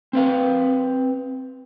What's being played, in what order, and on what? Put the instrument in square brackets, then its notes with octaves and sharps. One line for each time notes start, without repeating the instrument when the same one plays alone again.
[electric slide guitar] C4 B4 F5